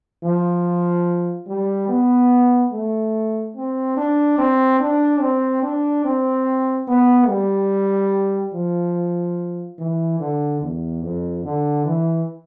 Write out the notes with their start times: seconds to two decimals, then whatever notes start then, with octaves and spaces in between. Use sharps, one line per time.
0.24 F3
1.47 G3
1.88 B3
2.72 A3
3.56 C4
3.97 D4
4.38 C4
4.80 D4
5.21 C4
5.63 D4
6.04 C4
6.88 B3
7.28 G3
8.54 F3
9.78 E3
10.20 D3
10.61 E2
11.03 F2
11.44 D3
11.85 E3